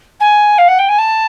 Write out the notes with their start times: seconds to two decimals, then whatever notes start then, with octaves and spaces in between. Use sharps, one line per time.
0.20 G#5
0.58 F5
0.68 F#5
0.78 G5
0.88 G#5
0.98 A5